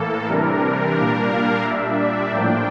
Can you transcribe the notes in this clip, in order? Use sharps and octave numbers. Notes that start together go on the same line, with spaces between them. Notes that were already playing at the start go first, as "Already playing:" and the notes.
Already playing: A2 E3 A#3 A4
C3 E3 G3 D4 A#4
A#4
A#2 G3 A#3 D4 A#4
F5
A#2 G3 D4 E5
D5
A2 F3 A#3 D4 G5